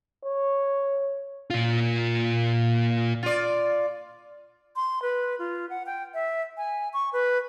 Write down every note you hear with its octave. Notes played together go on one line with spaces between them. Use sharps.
C#5
A#2 F4
F4 D5
C6
B4
F4
F#5
G5
E5
G#5
C#6
B4